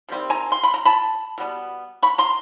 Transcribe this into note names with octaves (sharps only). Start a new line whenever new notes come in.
C3 D#3 G3 C4
G#5 A#5
C6
B5
A#5
A5 B5
B2 G3 B3
B5 C#6
A#5 C6